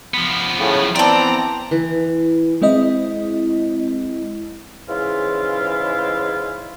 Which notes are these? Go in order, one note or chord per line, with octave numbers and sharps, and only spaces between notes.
F3 B3
A2 C#3
E3 B3 C4 A4 D5 A#5
E3
G#3 C4 E4 D#5
G#2 C#3 E3 E4 F4